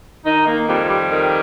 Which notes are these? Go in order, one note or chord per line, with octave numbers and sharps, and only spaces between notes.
D#3 D#4
A#3
F2 G3
G3
D#3